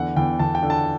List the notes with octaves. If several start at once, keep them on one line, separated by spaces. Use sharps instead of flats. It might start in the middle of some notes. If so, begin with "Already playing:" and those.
Already playing: E2 D3 F#5
E2 G5
E2 A5
G5
D3
A5